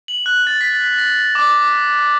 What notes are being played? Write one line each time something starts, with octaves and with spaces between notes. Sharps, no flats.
F#7
F#6
A6
B6
A#6
D6